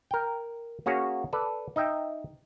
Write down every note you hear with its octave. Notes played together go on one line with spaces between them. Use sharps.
A#4 G5
A#3 C#4 F#4 G#4 C#5
A4 B4 D5
D#4 D#5 E5 G5